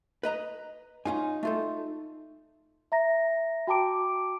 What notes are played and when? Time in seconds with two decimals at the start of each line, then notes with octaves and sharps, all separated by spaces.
0.23 B4 D#5 A#5
1.05 C#4 D#4 F4 G#5
1.43 A3 F4 A4
2.92 E5 A#5 A#6
3.67 F#4 G5 A5 A#5 D6 D7